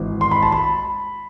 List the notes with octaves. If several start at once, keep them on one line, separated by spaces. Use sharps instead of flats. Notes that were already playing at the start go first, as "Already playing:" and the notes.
Already playing: G#1 G#2 E3
C6
B5
A5
B5